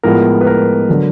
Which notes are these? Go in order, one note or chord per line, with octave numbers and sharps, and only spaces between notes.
A2 F3 G#3 B3 A#4
B4
A#4
D3 F#3